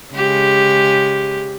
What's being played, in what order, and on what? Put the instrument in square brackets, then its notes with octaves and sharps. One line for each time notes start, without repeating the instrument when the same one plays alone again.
[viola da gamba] C#3 G#3 G4